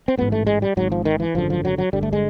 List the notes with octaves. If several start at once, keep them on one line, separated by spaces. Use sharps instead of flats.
C4
A1 G#2 B3
A3
G#3
G3
G#1 G#2 F#3
F3
D#3
E3
G#1 F#2 D3 F3
F3
F#3
F#3
G1 G2 D3 G3
A3
G#3